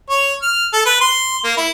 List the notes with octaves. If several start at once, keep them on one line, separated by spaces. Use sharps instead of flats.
C#5
F6
A4
B4
C6
A#3
E4